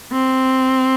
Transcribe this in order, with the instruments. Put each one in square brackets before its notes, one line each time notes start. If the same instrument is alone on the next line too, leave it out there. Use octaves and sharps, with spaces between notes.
[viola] C4